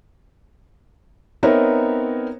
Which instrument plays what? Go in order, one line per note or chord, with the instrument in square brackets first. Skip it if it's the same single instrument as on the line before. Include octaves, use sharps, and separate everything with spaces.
[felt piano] B3 C4 D#4 A#4 C#5 E5